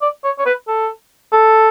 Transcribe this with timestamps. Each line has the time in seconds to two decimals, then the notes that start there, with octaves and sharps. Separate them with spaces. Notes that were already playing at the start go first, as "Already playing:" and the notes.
0.02 D5
0.24 C#5
0.38 C#5
0.46 B4
0.68 A4
1.33 A4